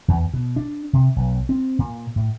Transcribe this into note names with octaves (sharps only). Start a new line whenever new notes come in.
E2
B2
D4
C3
B1
C4
A#2
A2